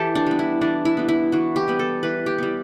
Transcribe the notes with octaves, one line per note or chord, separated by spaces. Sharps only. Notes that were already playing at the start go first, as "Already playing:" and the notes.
Already playing: E3 G4 A4
D4
G3 B3
E4
E3 D4
E4
G3 B3
E4
E3 F#4
G4
G3 B3
A4
E3 B4
G4
G3 B3